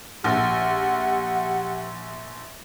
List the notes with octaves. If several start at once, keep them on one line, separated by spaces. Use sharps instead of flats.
A#1 G4 F#5